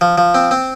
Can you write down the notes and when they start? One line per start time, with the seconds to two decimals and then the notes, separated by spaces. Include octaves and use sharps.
0.01 F3
0.18 F3
0.34 C4
0.51 C4